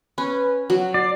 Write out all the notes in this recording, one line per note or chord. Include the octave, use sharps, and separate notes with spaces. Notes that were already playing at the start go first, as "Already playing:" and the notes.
C#4 B4
F#3 F#4
D5 C7